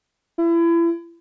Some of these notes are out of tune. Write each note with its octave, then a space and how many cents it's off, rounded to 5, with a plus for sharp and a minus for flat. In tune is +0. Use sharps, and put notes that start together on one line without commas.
E4 +30